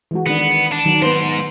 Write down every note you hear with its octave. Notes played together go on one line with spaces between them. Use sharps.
E3 G#3 F#4
D#3 B3 D4
D4
D#3 F#3 D#4
G#2 B3 B4 C5 C6